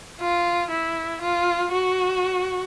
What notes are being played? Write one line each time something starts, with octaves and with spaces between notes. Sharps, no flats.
F4
E4
F4
F#4